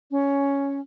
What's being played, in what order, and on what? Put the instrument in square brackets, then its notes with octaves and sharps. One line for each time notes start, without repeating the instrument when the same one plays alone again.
[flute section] C#4